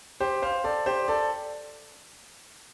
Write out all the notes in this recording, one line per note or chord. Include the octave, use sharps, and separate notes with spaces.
G4 C5
C5 F5
A4 D5
G4 C5
A4 D5